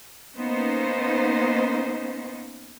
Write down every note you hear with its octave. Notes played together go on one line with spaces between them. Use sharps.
A#3 B3 C#4 D#4 C5